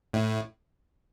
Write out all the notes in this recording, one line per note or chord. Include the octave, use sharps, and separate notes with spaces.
A2